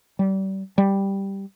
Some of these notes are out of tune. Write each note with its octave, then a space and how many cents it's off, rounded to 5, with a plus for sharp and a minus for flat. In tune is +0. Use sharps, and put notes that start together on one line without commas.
G3 -30
G3 +0